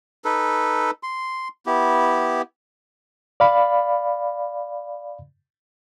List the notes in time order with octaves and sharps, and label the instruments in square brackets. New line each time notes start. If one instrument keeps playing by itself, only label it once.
[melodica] D#4 A4 B4
C6
B3 E4 G4
[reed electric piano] D5 F5 B5